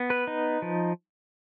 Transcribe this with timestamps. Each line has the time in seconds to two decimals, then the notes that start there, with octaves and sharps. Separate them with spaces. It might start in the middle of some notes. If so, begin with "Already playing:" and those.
Already playing: B3
0.10 B4
0.27 D#4
0.62 F3